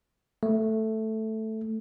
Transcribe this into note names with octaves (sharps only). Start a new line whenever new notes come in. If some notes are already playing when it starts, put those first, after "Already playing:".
A3